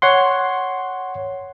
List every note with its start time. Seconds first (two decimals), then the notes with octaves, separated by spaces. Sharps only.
0.02 C#5 F#5 C6